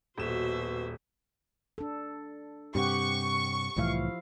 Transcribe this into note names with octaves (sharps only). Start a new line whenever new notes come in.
D#1 B2 F#4 C5 E5 E7
D4 A4
G2 C3 G4 F#5 C#6
C2 A2 E3 F3 E4 F5